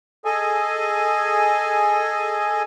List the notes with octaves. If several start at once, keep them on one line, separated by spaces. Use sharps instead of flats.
G#4 A4 D#5 G#5